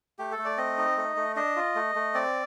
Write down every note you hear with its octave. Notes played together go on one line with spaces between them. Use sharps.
A3 G4
A4
A3
D5
C4 D#5
D#4
A3
A3
D4 D#5
F4
A3
A3
C4 D5